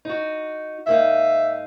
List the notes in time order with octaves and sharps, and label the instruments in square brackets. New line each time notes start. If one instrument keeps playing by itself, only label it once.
[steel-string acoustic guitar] D#4 F#4
[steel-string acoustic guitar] G#2 A#3 D#4 [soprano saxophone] E5